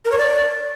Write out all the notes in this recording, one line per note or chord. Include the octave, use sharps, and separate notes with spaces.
A#4
C#5
D5